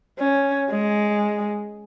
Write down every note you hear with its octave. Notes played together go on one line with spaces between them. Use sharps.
C#4
G#3